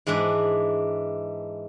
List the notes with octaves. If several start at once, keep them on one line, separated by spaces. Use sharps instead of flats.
G#2 E3 G#3 D4